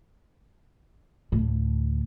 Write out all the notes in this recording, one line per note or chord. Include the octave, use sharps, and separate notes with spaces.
D2 A2